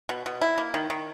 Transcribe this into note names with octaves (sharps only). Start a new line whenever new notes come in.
B2
B2
E4
A#3
D#3
D#3